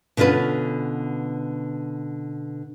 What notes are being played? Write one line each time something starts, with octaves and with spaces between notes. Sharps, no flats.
B2 D3 C#4 F4 B4